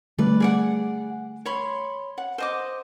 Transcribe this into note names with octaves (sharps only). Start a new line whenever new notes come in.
D3 G3 A3 B4 D5
G#4 D5 F#5
C#5 B5 C6
F#5
C5 D#5 D6